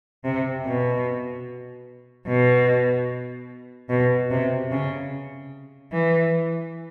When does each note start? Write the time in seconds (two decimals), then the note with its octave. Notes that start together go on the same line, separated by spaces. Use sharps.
0.24 C3
0.66 B2
2.27 B2
3.90 B2
4.31 C3
4.71 C#3
5.93 E3